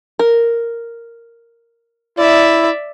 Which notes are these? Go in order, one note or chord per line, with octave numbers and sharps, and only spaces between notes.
A#4
E4 D5 E5